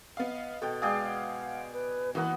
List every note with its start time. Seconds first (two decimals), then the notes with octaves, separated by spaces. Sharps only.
0.17 B3 D#5 F5
0.62 B2 A4 G5
0.82 G#3 G#4 D5 F5 G5
1.02 F#5
1.72 B4
2.15 E3 F#3 A#3 B3 A#4 F#5